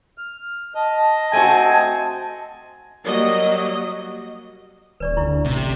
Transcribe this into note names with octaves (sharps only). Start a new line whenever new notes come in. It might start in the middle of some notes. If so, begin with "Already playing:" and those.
F6
D#5 A5
A3 C4 F#4 G#5
F#3 G3 A#3 D#5
D#1 B4 D5 C#6
D2 E4 C#6
A1 C3